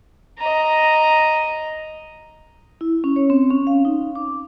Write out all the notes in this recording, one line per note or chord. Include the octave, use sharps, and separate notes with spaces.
D#5 A#5
E4
C#4
C#5
C4
C#4
F5
D#4
D6